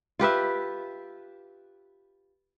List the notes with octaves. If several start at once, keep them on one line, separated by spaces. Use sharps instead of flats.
F4 G4 B4 E5